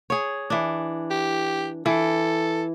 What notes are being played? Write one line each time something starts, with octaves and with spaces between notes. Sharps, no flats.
G#4 C#5
E3 D4
G4
E3 A4